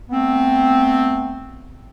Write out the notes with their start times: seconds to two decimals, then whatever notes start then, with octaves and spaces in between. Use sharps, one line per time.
0.10 A3 B3 C4